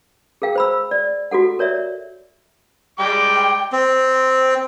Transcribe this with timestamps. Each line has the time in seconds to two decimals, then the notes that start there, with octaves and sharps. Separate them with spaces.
0.42 G#4 A#4 F5 G5
0.56 C5 B5 E6
0.91 D5
1.31 F#4 G4 A4 F#5
1.59 A#4 C#5 D5 E5
2.99 G3 G#3 G5 D6
3.72 C4